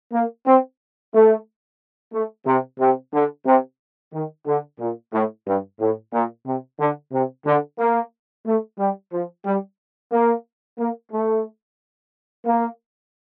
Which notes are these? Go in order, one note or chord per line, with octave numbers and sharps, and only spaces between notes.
A#3
C4
A3
A3
C3
C3
D3
C3
D#3
D3
A#2
A2
G2
A2
A#2
C3
D3
C3
D3
A#3
A3
G3
F3
G3
A#3
A#3
A3
A#3